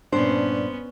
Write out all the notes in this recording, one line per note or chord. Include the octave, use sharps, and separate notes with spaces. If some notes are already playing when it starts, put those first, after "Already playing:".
G2 A#2 B3 C#4 D4 C5